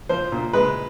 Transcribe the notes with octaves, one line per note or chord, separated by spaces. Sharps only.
F3 C5
A#2
G#3 B4